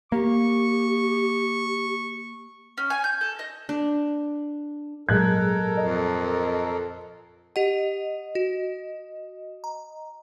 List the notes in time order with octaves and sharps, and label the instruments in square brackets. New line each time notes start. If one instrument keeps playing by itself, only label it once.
[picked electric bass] A#3 [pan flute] G4 [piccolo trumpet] C#6
[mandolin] C#4
G#5
G6
A4
D#5
[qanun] D4
[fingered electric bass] G#1 A#2 F#3 [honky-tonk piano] G#3 F#6 G#6 [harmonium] A4 A#4
[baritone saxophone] F2 [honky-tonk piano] D#5
[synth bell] G4 F#5 [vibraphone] D#5
[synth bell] F#4
A#5